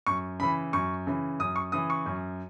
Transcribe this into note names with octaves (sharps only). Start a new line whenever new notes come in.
F#2 C#6
C#3 E3 B5
F#2 C#6
C#3 E3
F#2 D#6
C#6
C#3 E3 D#6
C#6
F#2